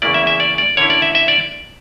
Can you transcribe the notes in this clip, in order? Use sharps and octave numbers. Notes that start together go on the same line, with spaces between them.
E2 C#3 E3 A#3 E4 D5
E5
E5
D5
D5
D3 A#3 C#4 E4 C#5
D5
E5
E5
D5